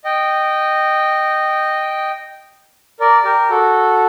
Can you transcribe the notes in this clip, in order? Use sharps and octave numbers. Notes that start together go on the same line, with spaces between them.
D#5 G5
A#4 D5
G4 A#4
F#4 A4